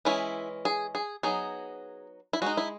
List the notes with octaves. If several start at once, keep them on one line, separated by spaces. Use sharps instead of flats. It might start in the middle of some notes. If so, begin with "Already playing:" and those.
E3 G#3 C#4 E4
G#4
G#4
F#3 B3 D#4 G#4
E4
G#3 D#4 F#4
E4